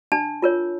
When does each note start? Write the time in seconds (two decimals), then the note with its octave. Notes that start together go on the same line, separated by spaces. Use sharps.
0.12 D4 A5
0.42 F4 A#4 C#5